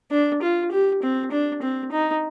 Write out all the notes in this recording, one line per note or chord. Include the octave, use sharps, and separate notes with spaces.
D4
F4
G4
C4
D4
C4
D#4